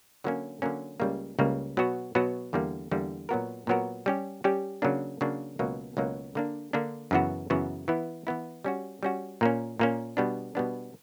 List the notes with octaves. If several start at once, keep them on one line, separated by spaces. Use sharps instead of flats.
D3 F#3 A#3 C#4
D3 F#3 A#3 C#4
C#2 C#3 G3 A#3
C#2 C#3 G3 A#3
B2 F#3 B3 F#4
B2 F#3 B3 F#4
E2 D3 G3 A#3
E2 D3 G3 A#3
A#2 F#3 B3 F#4 A#4
A#2 F#3 B3 F#4 A#4
G3 C#4 G4
G3 C#4 G4
C#3 F#3 A#3 D4
C#3 F#3 A#3 D4
C#2 B2 F#3 A#3
C#2 B2 F#3 A#3
D3 A#3 D4
D3 A#3 D4
F#2 C#3 E3 B3 F#4
F#2 C#3 E3 B3 F#4
E3 B3 E4
E3 B3 E4
G3 C#4 F#4
G3 C#4 F#4
A#2 A#3 C#4
A#2 A#3 C#4
B2 G3 B3 D4
B2 G3 B3 D4